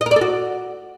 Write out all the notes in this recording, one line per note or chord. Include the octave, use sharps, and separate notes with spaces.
D#5
A#4
D5
A4
F#4